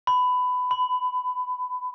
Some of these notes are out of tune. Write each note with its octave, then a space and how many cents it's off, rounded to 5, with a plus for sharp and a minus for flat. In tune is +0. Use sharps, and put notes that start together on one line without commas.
B5 +20
B5 +35